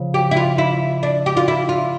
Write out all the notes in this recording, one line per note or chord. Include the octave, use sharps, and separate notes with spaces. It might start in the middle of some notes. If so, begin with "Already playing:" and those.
Already playing: C#3 F3
G4
E4
F4
E4
D4
G4
F4
E4
F4